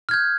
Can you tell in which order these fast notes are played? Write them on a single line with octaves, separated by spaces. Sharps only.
F6 G#6 G6